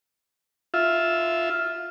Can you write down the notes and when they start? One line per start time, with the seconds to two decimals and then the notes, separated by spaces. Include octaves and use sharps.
0.74 F4 E5